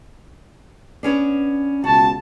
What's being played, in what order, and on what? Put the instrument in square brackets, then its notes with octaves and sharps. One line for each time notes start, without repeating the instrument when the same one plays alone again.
[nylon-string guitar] B3 C#4 D4
[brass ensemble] C#2 B2 A5 [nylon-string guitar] F#4